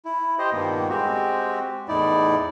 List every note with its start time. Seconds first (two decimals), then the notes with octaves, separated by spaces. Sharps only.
0.05 E4
0.39 G4 C5 D#5
0.53 G2 A#2 D#3 A#3 B3
0.90 G#3 C4 F#4 G4
1.89 E2 A2 D#4 E4 D5